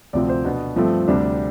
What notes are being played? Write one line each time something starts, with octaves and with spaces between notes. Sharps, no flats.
D2 C3 F3 C4 D5
C5
B2 B3 D4
G2 F3 A3 C4
D2 C3 G3 D4